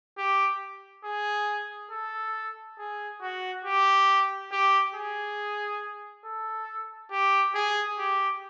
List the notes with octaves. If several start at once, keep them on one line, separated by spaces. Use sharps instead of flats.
G4
G#4
A4
G#4
F#4
G4
G4
G#4
A4
G4
G#4
G4